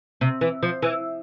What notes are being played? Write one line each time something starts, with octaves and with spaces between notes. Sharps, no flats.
C3
E3
F3
E3